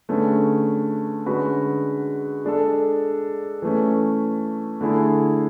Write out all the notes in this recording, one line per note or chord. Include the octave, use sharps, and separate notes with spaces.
D3 A3 C#4 G#4 B4
D3 G#3 C#4 F#4 B4
G#3 D4 A4
E3 A3 C#4
D3 A3 E4 G#4